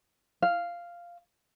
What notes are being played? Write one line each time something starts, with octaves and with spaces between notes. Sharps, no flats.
F5